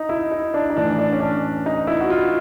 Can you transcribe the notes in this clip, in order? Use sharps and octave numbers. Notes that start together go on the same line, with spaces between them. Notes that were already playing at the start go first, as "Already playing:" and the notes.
Already playing: D#4
E4
D#4
D4
D#4
A2 E3 D4
D4
C#4
D4
D#4
E4
F#4
F4